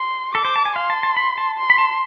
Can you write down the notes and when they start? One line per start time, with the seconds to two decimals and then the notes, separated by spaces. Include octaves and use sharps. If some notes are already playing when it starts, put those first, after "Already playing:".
Already playing: C6
0.35 A4 D6
0.45 C5
0.56 A5
0.65 G#5
0.76 F5 C6
0.90 A5
1.03 A5
1.17 B5
1.38 A5
1.57 C6
1.70 B5
1.78 A5